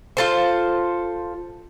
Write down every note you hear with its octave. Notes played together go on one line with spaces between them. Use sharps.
F4 A4 C5